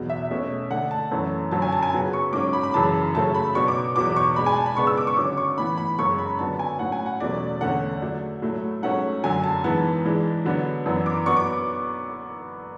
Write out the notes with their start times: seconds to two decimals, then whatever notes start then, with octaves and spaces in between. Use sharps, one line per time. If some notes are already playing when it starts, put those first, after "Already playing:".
Already playing: E2 B2 F#3
0.10 E5
0.31 B2 A3 C#4
0.70 D3 A3 D4 F#5
0.91 A5
1.11 F#2 E3 A3 C#4
1.51 F#2 D3 F#3 C#4 A5
1.62 G#5
1.72 A5
1.83 G#5
1.93 C#3 F#3 B3
2.13 C#6
2.32 G#2 F#3 C#4 D6
2.53 B5
2.64 B5
2.74 F#2 C#3 E3 A5
3.14 C#3 F#3 A3 C#4 A5
3.34 B5
3.55 B2 F#3 B3 D4 C#6
3.68 D6
3.96 E2 B2 F#3 B3 D6
4.16 C#6
4.36 B2 G#3 D4 B5
4.46 G#5
4.57 A5
4.66 B5
4.77 C#3 G#3 B3 D4 C#6
4.87 E6
4.97 D6
5.07 C#6
5.17 D3 F#3 C#4 D6
5.37 C#6
5.58 A2 E3 B3 B5
5.78 B5
5.99 F#2 C#3 G#3 C#4 C#6
6.18 B5
6.39 D3 F#3 B3 D4 A5
6.59 G#5
6.79 A2 F#3 C#4 F#5
6.92 G#5
7.06 F#5
7.20 E2 B2 F#3 A3 C#4 D5
7.61 E2 D3 A3 C#4 F#5
8.01 D3 F#3 A3 D4
8.42 A2 F#3 A3
8.83 G#2 F#3 A3 C#4 F#5
9.23 F#2 D3 F#3 G#5
9.44 A5
9.64 G#2 E3 B3 A5
10.05 G#2 E3 G#3 D4
10.45 D3 F#3 B3 D4
10.86 F#2 E3 B3 D4
11.06 D6
11.26 F#3 B3 D4 C#6
11.37 D6